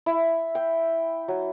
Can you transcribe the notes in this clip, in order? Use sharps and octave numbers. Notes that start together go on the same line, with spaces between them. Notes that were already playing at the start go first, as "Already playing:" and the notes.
E4
G5
F#3